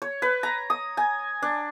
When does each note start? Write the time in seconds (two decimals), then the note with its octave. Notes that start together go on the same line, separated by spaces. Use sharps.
0.02 C#5
0.22 B4
0.43 A#5
0.70 D#6
0.97 G#5
1.42 D4